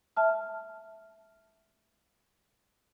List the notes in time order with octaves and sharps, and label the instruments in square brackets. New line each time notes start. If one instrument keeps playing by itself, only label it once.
[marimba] E5 A5 F6